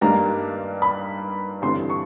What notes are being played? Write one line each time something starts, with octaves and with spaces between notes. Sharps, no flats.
G2 D#3 G3 A#3 D4 A#5
B5
A1 G2 D3 G3 C4 C6
C#6